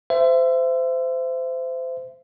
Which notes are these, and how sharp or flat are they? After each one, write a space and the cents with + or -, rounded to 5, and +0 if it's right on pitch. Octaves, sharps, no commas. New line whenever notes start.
C5 -25 E5 +25